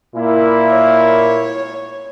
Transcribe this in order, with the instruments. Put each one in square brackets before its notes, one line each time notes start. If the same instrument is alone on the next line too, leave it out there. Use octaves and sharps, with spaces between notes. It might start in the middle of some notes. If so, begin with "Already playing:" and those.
[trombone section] A#2 A#3 E4
[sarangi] C#5